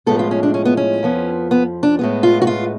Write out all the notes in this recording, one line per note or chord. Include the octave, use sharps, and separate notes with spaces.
A2 F3 G#3 B3 A4
F4
C#4
D4
C#4
B3
C#4
F2 F3 B3
B3
D4
A2 G#3 B3
F4
F#4
F4